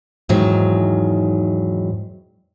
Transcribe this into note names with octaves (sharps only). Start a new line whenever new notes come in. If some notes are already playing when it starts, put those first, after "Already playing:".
E2 G#2 D#3 F#3